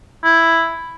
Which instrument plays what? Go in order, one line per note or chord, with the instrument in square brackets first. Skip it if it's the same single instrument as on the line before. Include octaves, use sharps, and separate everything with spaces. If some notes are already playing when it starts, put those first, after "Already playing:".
[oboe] E4